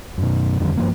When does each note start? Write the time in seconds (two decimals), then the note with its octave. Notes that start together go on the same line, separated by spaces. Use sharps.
0.18 F#2 B2
0.60 F2 D3 D#3 G3
0.77 G2 F3 A#3